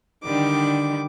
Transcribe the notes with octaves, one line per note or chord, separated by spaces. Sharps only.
D3 D#3 G3 D6